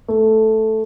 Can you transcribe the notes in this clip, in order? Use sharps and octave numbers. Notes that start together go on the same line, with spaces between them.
A3